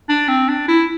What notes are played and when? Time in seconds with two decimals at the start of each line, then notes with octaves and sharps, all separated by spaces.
0.09 D4
0.28 C4
0.48 D4
0.68 E4